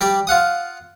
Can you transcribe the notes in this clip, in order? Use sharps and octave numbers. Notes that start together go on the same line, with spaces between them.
G3 G4 D5 D6
F4 F5 F#5 D#6